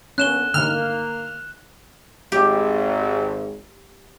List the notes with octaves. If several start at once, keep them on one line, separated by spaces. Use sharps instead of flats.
D3 A#3 B3 C#4 F#6 E7 G7
D3 D#3 A#3 F6
G#1 G4